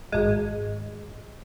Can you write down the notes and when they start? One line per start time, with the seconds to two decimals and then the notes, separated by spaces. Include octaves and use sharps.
0.12 G#1 G#3